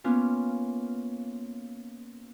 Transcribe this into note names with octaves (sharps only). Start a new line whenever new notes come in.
A#3 B3 C#4 F4